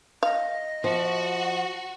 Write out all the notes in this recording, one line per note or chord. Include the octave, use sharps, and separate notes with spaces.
D#5 F5
F3 F#4